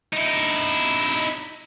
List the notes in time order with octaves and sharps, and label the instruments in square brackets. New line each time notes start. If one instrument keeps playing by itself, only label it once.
[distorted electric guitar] D#4 E4